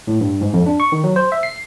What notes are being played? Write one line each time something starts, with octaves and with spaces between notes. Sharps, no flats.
A2
G2
G#2
F2
D4
C#6
D#3
F#3
C5
E5
C7